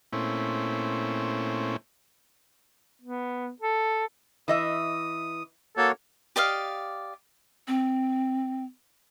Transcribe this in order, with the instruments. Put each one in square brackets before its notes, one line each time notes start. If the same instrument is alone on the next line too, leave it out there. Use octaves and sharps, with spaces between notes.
[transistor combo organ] A#2 A3 C4 C#4 E4
[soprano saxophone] B3
A4
[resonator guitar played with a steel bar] E3 D#5 E5 [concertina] D#6
[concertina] A#3 F#4 C#5 [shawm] A4
[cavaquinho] G4 D5 D#5 F5
[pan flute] C4